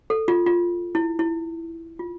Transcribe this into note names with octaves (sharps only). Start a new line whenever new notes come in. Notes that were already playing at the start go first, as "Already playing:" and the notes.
A4
F4
F4
E4
E4
F4